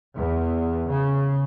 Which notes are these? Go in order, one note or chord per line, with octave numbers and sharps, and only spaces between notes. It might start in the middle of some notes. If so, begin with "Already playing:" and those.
E2
C#3